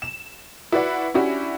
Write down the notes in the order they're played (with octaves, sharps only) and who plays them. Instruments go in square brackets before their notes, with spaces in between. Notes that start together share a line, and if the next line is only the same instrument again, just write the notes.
[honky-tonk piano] E7
E4 F#4 B4 D5 F#5
C#4 D4 E4 F#4 G4